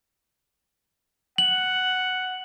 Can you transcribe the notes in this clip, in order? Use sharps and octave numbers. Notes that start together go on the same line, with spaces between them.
F#5 F#7